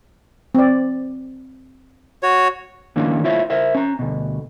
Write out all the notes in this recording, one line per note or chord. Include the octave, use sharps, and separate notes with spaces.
C4 D5
F#4 C#5
D#3 A#3 C#4 D4 E4
E4 F4 C5 C#5 E5
A#4 C5 E5
C#4 A#5
D2 B2